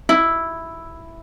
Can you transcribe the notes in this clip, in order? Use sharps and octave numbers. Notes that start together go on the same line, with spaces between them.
E4